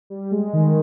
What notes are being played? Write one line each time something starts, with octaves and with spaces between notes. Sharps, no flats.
G3
G#3
D#3